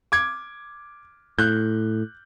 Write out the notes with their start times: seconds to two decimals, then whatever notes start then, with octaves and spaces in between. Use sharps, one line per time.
0.12 D6 G#6
1.39 A2 F#6 G6